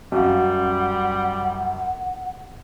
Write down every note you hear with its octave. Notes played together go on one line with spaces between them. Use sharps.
F#2 G3 C#4 F5 F#5